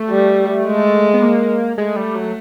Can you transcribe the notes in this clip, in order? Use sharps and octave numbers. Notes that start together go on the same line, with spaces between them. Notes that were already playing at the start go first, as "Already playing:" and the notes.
Already playing: A3
G3
G#3
B3
A#3
G#3 A3
G3
F#3